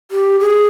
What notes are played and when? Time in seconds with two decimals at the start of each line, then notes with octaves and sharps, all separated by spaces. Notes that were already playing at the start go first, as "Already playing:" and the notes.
0.11 G4
0.40 G#4